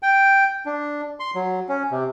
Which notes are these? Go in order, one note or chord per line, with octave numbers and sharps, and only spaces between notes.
G5
D4
C6
F#3
C#4
C3